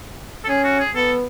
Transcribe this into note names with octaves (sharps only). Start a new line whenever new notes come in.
A4
C#4 G#4
F#4
G#4
B3 A4